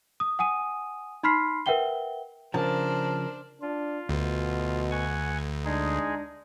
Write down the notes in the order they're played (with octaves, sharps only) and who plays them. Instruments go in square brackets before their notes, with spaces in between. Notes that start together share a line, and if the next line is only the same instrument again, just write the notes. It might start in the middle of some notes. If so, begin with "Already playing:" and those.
[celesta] D#6
F#5 G#5 D#6 D#7
D#4 B5 C6 F6 B6 C7
A#4 B4 E5 F#5 G5 G7
[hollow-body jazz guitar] C#3 F3 [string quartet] D4 C5 [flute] A#4 [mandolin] A5
[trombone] D4 [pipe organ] F4
[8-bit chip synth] D2 [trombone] B2
[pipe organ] F#5 G#5 C#6
[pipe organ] G#3 D#4 G#4 [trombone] D4